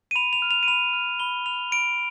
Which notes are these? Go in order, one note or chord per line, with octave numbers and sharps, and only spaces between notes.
D#7
B5 F7
F7
F6
F7
D#7
B5 F7
F6
B5 G7
F6 F7
B5 D7